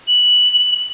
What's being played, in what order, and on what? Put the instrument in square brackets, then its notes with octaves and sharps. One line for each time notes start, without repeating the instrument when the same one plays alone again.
[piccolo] F#7